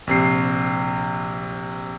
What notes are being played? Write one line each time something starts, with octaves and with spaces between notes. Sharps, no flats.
A#1 C3 C7